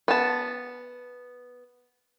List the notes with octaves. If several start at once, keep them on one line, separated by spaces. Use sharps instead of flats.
B3 A5